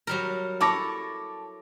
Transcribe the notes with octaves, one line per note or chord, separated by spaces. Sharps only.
F#3 G3 A#4
E4 A4 C#5 A5 D6 A#6